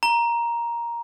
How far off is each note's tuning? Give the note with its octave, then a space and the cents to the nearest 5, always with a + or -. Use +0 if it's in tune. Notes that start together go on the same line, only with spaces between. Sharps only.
A#5 +10